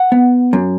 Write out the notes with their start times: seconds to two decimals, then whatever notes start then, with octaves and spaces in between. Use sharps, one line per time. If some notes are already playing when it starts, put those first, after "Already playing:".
Already playing: F#5
0.12 B3
0.53 F#2